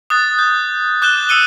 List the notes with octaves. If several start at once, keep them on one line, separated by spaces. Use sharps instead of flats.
D#6 F#6 A6
G6
D6 F#6 G6 E7 G7
D#6 E6 C#7 D#7 G7